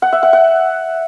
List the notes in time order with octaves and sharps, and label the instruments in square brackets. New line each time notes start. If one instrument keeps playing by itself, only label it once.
[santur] F#5
E5
F#5
F#5